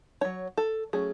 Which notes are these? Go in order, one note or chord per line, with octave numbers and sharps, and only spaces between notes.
F#3 C#4 C#5
A4
F#3 A3 C#4 G#4